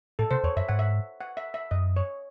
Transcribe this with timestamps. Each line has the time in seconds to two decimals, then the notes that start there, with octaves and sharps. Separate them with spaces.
0.19 A2 A4
0.31 C3 C5
0.44 E2 C#5
0.57 F#2 E5
0.69 G#2 F#5
0.79 E5
1.21 F#5
1.37 E5
1.54 E5
1.71 F#2 D#5
1.96 C#5